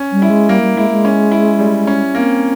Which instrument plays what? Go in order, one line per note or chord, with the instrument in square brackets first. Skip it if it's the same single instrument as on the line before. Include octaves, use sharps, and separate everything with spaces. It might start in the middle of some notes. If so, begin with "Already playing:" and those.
Already playing: [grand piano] C#4
[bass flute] G3
[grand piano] E4
[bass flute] G#3
[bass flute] G3 [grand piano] A#3
[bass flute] G3
[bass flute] G#3 [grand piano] E4
[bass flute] G#3
[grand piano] C#4
E4
G3
C#4
[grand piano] A#3 [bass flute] C4